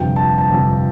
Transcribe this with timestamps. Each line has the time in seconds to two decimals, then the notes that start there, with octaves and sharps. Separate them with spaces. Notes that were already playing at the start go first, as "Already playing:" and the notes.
Already playing: G1 F2 C3 F3 G5
0.16 A5
0.38 A5
0.50 G1 F2 C3 F3